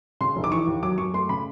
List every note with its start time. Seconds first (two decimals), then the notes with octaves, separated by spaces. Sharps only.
0.21 C#3 C6
0.36 F1
0.44 D6
0.51 E3 C#6
0.67 D#2
0.82 F#3 D6
0.98 F#2 C#6
1.14 A3 C6
1.29 C#3 B5